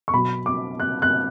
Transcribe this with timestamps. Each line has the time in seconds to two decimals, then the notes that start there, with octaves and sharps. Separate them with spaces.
0.08 C#6
0.13 B2 F#3 B5
0.46 D6
0.80 F#6
1.02 F#6